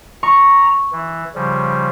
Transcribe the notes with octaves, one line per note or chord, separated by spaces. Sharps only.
A#5 C#6
E3
C#3 F3 G3